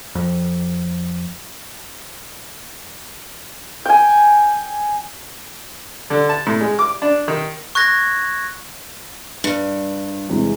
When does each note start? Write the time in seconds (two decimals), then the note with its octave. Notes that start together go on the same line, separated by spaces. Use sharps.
0.15 F2
3.85 G5 G#5
6.10 D3
6.29 A5
6.47 A2
6.61 G#3
6.79 D6
7.02 D4
7.28 D#3
7.75 C#6 F#6 G#6 A#6
9.44 G2
10.29 E2 C3 G#3